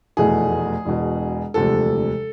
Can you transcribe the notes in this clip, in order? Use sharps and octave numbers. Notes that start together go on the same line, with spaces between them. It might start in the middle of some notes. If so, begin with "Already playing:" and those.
F1 E2 B2 A3 G#4
E1 E2 B2
E1 D2 C3 F3 A4